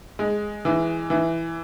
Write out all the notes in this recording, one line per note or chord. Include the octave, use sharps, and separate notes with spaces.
G#3
E3
E3